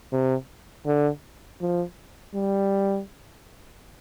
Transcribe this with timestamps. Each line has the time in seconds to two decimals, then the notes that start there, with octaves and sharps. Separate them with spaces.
0.12 C3
0.86 D3
1.61 F3
2.34 G3